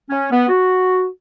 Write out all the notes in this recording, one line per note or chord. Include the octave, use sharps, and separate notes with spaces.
C#4
B3
F#4